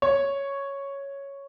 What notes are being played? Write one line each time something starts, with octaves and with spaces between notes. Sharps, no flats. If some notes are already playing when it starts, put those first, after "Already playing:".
C#5